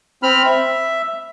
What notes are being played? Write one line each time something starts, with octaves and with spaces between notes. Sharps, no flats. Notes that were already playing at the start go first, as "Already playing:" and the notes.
C4 B5 F6
E5